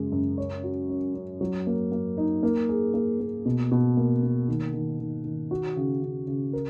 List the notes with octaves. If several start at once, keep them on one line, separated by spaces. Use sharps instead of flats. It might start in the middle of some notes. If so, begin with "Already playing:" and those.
Already playing: F#2 C#3 G#3
F#2
C#5
F#4
C#4
C#4
F#3
A#3
A#3
D#4
A#3
G#4
A#3
A#3
B2
B2
A#3
A#3
D#3
D#3
D#3
D#3
F#4
C#3
C#3
C#3
A#4